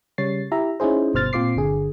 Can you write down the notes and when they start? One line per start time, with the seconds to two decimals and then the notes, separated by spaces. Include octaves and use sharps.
0.18 C#3 G3 C#5 A6 C7
0.52 E4 G4 E5 A#5
0.80 C#4 D#4 E4 G#4 C5
1.13 G1 G2 B2 C5 F6 A6
1.33 A#2 C4 F4 C5 D6 C7
1.56 G1 D3 G#4